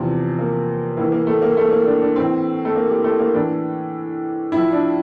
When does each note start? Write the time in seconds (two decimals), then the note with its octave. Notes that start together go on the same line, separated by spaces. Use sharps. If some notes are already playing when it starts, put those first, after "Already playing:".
Already playing: E2 C3 F3 C4
0.39 A#3
0.97 A2 E3 A#3
1.12 A#3
1.27 A3
1.42 A#3
1.57 A3
1.71 A#3
1.86 D4
2.01 D4
2.16 A2 E3 C4
2.65 A3
2.75 A#3
2.89 G4
3.04 A3
3.19 A#3
3.34 A2 E3 D4
4.52 A2 F3 E4
4.72 D4